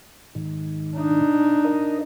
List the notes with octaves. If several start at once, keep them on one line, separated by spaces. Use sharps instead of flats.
G#2 D#3
D4 D#4
A#4 D#5